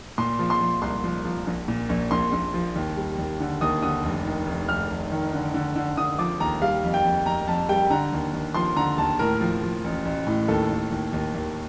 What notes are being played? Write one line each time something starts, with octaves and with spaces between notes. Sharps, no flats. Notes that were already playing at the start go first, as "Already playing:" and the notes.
A#2 C6
F3
C6
F3
C2 C6
F3
F3
A#1
A#2
A#1
A#1 C6
A#1
F3
D#2
G3
D#2
D3
D#2 D#6
D3 D#6
F1
D#3
F1
F1 F6
F1
D#3
D3
D3
D3
D3 D#6
F3 D6
D#2 A#5
G3 F5
F2
G5
F2
F2 A#5
F2 A5
G3 G5
D3 A#5
D#2
D#2
F3 C6
D3 A#5
D#2 A5
A2 A#4
F3
F3
A1
A1
A2
D#2 A4
D#2
D#2
D#2
D#2